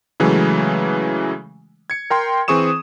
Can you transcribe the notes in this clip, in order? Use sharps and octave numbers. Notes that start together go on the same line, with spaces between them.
C#3 E3 F#3 G#3 A3
G#6 C#7
A#4 G5 C6
E3 C4 G#4 C#6 D#6 E7